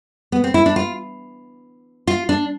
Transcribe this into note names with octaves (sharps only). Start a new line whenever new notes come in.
B3
C4
E4
D4
F4
F4
D4